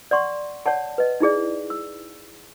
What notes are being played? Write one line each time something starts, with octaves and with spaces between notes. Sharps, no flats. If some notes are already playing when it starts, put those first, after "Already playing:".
D5 F#5 C6 C#6
C#5 D5 F#5 A5
B4 D#5
D#4 E4 G#4 D5
E6